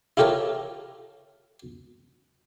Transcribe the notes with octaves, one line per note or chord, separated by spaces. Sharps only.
E4 F4 G4 A4 A#4 C#5